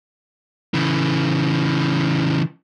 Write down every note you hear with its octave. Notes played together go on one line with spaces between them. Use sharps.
C#3 E3